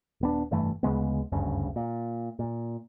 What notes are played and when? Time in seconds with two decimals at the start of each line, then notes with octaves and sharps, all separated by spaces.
0.21 D#1 B3 D4
0.51 F1 G2 E3 A3
0.83 D2 C#3 G#3 B3
1.32 F#1 D2 G2 C#3
1.76 A#2
2.39 A#2